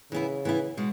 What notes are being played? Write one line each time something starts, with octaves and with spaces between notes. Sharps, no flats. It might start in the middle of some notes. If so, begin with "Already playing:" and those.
C#3 E3 B3 E4
E3 B3 E4
B2 G#3